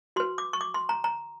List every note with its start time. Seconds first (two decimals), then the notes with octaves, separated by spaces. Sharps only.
0.16 F#4 B4 C6
0.38 D6
0.53 C#6
0.61 D6
0.74 C6
0.89 A#5
1.04 A#5